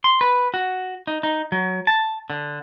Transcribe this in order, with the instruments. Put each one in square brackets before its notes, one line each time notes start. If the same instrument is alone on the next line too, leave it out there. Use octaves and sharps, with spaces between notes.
[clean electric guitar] C6
B4
F#4
D#4
D#4
F#3
A5
D3